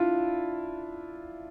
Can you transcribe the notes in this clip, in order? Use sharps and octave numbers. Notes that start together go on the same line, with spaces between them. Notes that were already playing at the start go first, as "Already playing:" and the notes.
Already playing: D4 E4 F4